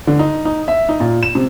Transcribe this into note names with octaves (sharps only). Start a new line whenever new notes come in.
D3
D#4
D#4
E5
D#4
A#2
E7
C3